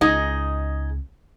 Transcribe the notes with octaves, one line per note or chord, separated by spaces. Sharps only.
C#2 D#4 G#4 D#5